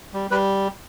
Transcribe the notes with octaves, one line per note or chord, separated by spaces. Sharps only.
G3
G3 B4